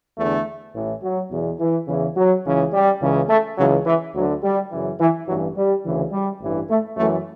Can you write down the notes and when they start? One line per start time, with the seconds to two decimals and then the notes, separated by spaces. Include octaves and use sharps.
0.17 E2 D3 A3
0.74 A1 A2 E3
1.02 F#3
1.31 E2 B2
1.59 E3
1.88 E2 C#3 E3
2.15 F#3
2.45 C#2 C#3 E3
2.73 G3
3.00 C#2 C#3 E3
3.28 A3
3.57 C#2 C#3 E3 F#3
3.85 E3
4.14 D2 D3 F#3
4.42 G3
4.70 F#2 C#3 E3
4.99 E3
5.26 A1 G2 E3 F#3
5.56 G3
5.84 D2 C#3 E3
6.12 G3
6.40 A1 G2 E3
6.69 A3
6.96 F#2 E3 A3